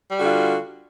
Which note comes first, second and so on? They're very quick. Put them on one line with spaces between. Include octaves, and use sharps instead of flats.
G3 F#4 D3 F4